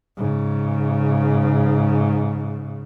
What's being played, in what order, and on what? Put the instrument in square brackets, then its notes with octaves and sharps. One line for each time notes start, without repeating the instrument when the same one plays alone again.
[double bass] G#2 C#3